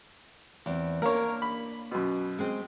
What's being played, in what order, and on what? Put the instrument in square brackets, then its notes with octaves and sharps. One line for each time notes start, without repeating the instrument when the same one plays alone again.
[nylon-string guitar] E2 C4
[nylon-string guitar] A#3 D4 [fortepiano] A#4 C#5
[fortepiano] B5
F#2 B2
[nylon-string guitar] G#3 C4